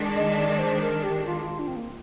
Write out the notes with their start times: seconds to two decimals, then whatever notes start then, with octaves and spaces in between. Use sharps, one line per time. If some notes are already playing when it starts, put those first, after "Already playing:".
Already playing: D#3 G#3 D4
0.15 D#5
0.37 D5
0.59 C5
0.81 A#4
1.03 G4
1.26 F4
1.42 F4
1.59 D4
1.67 C4
1.76 A#3